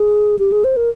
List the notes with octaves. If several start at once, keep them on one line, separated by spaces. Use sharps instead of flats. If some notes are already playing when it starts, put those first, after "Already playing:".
Already playing: G#4
G4
G#4
C5
A#4